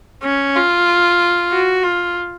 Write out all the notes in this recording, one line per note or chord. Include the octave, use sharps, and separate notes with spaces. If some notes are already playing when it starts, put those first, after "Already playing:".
C#4
F4
F#4
F4